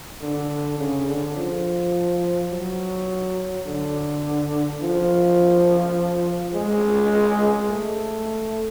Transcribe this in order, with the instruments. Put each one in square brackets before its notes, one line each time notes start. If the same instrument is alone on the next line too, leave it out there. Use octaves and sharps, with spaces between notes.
[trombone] D3
C#3
D3
F3
F#3
D3
F3
G#3
A3